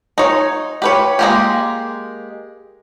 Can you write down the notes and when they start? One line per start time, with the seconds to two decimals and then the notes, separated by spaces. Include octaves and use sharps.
0.18 D#4 C#5
0.82 G4 B4 C#5
1.19 G#3 A#3 G4